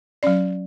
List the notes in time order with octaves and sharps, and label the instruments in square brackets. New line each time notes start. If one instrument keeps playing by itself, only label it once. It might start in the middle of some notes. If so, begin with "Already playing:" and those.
[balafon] F#3 C#4 D5